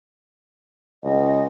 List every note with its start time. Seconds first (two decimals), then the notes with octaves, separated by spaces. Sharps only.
1.04 C#2 D#5